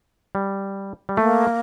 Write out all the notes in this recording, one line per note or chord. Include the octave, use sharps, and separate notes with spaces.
G3
G3
A3 A#3